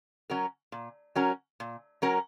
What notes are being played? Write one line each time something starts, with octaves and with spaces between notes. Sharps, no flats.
F#3 C#4 F#4 A#4
A#2
F#3 C#4 F#4 A#4
A#2
F#3 C#4 F#4 A#4